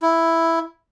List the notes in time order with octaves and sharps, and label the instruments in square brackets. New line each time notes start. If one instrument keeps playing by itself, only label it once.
[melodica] E4